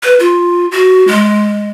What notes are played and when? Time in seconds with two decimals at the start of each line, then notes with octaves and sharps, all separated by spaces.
0.03 B4
0.20 F4
0.72 F#4
1.07 G#3